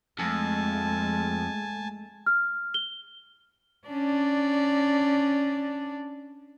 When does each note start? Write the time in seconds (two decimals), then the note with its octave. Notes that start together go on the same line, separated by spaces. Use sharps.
0.19 F2 G#3 A3 G#5 A5
2.26 F6
2.74 G7
3.88 C#4 D4 D5